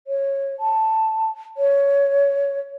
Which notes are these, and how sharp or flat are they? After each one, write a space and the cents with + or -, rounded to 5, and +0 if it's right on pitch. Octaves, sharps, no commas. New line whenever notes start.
C#5 -15
A5 +5
C#5 +15